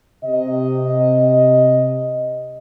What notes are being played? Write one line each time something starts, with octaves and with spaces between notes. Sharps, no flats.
C3 D#5